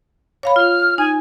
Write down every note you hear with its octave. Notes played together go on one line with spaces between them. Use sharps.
C#5 F5 B5
F4 F6
D#4 G#5